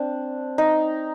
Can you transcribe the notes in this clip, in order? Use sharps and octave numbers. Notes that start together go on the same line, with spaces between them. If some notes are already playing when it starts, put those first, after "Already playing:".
Already playing: C4 D4
D#4